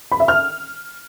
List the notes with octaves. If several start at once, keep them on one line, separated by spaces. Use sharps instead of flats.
B5
E5
F6